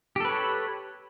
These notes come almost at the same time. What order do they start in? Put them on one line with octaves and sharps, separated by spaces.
G4 A4 B4 C#5